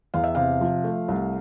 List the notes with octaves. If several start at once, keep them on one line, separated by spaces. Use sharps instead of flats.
E2 F5
E5
C3 F5
F3
A3
C2